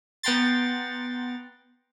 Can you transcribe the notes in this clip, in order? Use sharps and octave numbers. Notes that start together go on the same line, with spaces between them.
B3 F#5 G5 A#5 C6 A6